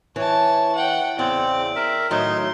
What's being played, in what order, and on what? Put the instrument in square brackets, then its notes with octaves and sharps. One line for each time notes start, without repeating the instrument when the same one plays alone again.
[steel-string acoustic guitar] E3 [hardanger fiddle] C#5 A5
[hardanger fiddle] F#5 G5
[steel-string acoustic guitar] E2 C#3 [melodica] C4 [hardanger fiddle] D5
[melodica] A#4 E5
[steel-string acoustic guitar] A2 D#3 F#3 [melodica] D#4 [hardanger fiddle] C6